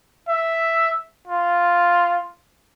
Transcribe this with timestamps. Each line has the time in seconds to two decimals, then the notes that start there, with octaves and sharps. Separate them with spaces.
0.29 E5
1.27 F4